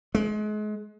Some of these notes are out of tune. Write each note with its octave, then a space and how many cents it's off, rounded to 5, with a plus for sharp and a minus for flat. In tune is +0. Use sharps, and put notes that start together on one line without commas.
G#3 +35